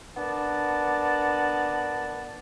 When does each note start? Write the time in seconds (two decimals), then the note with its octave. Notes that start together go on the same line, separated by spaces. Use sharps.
0.16 B3 D4 A#4 D5 A5